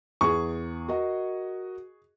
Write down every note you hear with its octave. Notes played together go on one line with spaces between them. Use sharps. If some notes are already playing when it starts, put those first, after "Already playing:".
E2 G#4 C#6
F#4 A#4 D#5